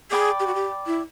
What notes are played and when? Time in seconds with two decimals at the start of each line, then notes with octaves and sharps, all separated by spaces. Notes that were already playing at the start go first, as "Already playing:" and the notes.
0.11 G#4 D5 G5 B5
0.40 G4
0.47 F#4
0.55 G4
0.86 E4